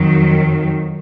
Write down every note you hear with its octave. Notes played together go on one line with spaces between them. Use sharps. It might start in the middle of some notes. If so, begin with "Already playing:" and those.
Already playing: F2 D#3 F#3